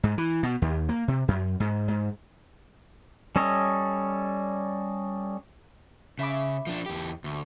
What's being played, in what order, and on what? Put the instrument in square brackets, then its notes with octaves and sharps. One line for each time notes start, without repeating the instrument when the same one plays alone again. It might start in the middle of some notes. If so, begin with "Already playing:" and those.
[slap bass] G#2
E3
B2
D#2
A#3
C3
F#2
G#2
G#2
[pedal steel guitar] G3 C#4 A4 C#5 D#5
[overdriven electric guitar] C#3 [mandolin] E5 B5 D6
[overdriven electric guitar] F3 D4
E2 G4
D2